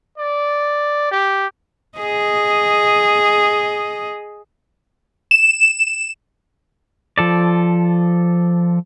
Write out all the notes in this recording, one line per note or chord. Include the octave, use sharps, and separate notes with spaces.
D5
G4
G#4 D#5
E7
F3 A4 D5